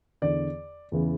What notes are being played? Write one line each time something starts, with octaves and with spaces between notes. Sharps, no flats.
E2 D3 D5
E2 C#3 E3